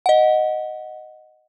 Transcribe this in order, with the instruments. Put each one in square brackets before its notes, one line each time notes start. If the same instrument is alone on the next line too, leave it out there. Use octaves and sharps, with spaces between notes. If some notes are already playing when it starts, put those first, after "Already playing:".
[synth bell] D#5 F#5